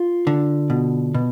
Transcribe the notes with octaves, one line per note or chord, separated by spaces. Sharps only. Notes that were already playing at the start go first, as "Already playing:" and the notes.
Already playing: F4
D3
B2
B2